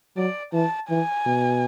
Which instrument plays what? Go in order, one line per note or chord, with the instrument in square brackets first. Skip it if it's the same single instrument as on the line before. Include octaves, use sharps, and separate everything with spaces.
[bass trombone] F#3 [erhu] D5
[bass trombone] E3 [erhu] A5
[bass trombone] E3 [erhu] G#5
[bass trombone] B2